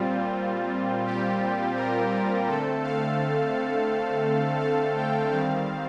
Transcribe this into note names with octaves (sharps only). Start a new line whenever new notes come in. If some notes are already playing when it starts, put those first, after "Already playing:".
Already playing: A#2 G3 C4 F4
G4
A#4
G4
D3 A3 C4 A4
F5
F5
G5
D#3 G3 C4 F5